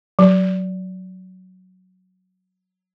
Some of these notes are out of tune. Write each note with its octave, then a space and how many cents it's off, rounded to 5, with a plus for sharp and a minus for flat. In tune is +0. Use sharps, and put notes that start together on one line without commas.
F#3 +0